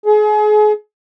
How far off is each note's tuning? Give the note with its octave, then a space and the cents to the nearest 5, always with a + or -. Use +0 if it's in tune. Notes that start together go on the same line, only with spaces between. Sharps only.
G#4 +35